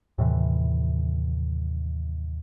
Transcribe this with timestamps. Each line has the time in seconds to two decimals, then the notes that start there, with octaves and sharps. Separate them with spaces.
0.18 D#2 A2 C3 E3